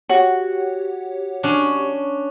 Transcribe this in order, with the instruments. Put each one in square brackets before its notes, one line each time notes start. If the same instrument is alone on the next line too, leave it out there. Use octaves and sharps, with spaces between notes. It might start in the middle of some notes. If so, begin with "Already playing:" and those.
[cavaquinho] F#4 [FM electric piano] G4 C#5 F#5
[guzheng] C#4 D4